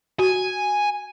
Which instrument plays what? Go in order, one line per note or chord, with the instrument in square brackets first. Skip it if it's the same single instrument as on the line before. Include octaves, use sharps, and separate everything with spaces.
[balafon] F#4 [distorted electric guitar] G#5